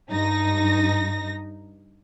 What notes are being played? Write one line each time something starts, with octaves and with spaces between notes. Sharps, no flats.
G2 D#4 A#6